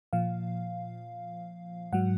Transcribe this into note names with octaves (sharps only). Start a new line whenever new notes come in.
A#2 F3 F5
G#2 F#3 F#5